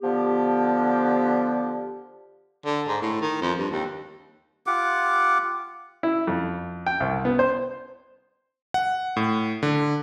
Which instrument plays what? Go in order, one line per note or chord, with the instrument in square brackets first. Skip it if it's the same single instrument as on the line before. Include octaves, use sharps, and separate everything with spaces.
[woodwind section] D3 F3 B3 G4
[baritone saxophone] D3
G#2
A2
D#3
F2
G2
D#2
[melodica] F4 G4 F#5 D6
[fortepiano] E4
F2
G5
C2
B3
C5
[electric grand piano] F#5
A2
D3